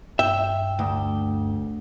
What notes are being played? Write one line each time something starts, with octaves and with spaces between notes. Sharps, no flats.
G2 E5 G5
D2